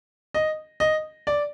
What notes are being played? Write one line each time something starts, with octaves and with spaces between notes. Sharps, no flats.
D#5
D#5
D5